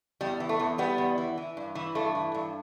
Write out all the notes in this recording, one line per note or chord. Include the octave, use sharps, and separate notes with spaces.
E2 G3
E3
A3
E2
E2 G3 B3
E2
E3
E3
G2
E3
G2 A3
E3
G2